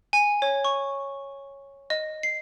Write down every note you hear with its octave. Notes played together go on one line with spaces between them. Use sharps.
G#5
C#5
C#6
D#5
C7